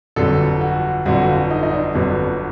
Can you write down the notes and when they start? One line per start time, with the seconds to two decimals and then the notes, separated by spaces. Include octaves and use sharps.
0.16 G1 F2 D3 F#3 A4
0.61 F#4
1.05 G1 F2 D3 F#3 F#4
1.28 F4
1.50 D#4
1.63 D#4
1.73 D4
1.94 G1 F2 D3 F#3 B3